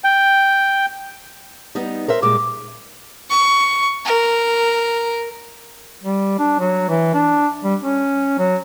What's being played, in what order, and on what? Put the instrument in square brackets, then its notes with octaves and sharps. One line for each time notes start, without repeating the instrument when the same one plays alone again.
[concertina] G5
[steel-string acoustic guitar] G3 B3 D#4
A#4 C5 E5
[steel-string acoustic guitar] A#2 G3 G#3 [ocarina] D6
[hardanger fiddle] C#6
A#4
[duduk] G3
D4
F#3
E3
D4
G3
C#4
F#3